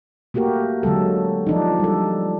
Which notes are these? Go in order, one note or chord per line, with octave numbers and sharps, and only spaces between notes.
A3 A#3 F#4 G4 A#4
D3 F#3 G#3 A4
F3 D4 D#4
G3 A4